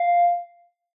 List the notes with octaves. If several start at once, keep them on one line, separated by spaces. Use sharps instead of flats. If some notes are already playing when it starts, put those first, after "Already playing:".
Already playing: F5